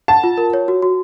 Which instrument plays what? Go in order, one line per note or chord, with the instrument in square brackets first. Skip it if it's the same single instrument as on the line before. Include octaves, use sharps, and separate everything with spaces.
[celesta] F#5 [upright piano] A5
[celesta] F4
A#4
C#5
F#4
F#4